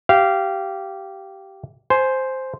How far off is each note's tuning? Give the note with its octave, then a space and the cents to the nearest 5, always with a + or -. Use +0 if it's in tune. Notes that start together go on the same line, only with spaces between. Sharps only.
G4 -15 F5 -20
C5 +0 G#5 +15